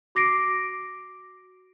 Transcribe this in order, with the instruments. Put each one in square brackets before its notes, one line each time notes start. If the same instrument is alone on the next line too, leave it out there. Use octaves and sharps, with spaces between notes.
[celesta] F#4 D6 A#6 C7 D7